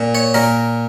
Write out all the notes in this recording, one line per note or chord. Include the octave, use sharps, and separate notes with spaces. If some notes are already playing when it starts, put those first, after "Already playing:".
Already playing: A#2
C#5
A#2 A#4